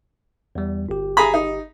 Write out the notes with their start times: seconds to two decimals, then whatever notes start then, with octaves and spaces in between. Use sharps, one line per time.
0.55 E2 G3
0.89 G1 G4
1.17 G#4 A#5 B5
1.34 D#4